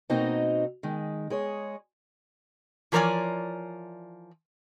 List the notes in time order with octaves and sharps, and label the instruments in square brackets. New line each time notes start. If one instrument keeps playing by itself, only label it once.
[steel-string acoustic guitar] B2 A#3 C4 D#4 F#4 D#5
D#3 G#3
G#3 G#4 C#5
[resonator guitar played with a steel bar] E3 F3 A#4 C#5 D5 G#5